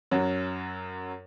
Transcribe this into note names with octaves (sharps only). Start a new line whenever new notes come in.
F#2 F#3